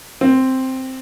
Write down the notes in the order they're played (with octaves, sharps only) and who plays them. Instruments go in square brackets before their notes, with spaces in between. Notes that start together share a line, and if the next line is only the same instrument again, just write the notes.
[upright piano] C4